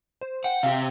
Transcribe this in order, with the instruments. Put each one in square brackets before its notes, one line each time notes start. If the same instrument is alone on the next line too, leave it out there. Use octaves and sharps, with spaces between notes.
[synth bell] C5
[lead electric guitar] F#5 [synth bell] G5
[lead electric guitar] C3 G4 [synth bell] F5